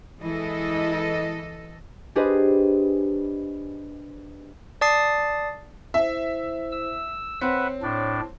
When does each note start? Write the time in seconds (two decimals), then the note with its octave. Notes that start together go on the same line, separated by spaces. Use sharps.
0.22 E3 G#3 E4 A4 D#5
2.15 D4 G4 G#4 B4 C5 D#5
4.81 D5 A5 D#6 A6 C7
5.94 E4 C5 E5
6.72 E6
7.41 C4 B4 C#5 E5 F#5
7.82 A2 D4